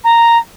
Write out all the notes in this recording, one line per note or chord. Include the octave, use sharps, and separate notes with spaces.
A#5